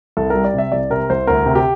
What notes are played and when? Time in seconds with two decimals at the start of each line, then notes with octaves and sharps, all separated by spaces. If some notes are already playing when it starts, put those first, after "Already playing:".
0.17 C2 A4
0.30 G3 A#4
0.44 D5
0.54 C3 E5
0.72 C2 D5
0.90 C3 A#4
1.10 C2 C5
1.27 D2 A#4
1.46 C3
1.55 G4